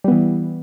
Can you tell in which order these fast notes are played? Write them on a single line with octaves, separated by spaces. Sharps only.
G3 B3 E3